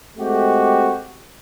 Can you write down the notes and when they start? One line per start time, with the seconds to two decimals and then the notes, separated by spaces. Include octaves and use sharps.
0.17 G#3 A3 C4 F#4 G4